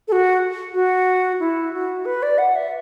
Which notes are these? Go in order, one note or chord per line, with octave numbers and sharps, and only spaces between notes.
A4
F#4
F#4
E4
F#4
B4
D5
F#5
E5